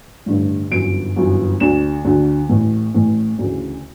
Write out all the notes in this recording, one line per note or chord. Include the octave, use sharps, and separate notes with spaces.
A1 G2 D3
G1 F#2 E3 D7
G1 F#2 E3
D2 D3 E7
D2 D3
A1 A2 E3
A1 A2 E3
D2 C#3 E3